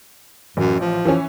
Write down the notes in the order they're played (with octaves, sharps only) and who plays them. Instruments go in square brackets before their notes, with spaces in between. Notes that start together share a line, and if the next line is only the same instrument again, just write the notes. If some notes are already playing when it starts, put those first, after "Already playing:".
[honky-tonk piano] A1 [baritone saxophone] F#2
[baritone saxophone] F3
[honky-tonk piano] E3 C#4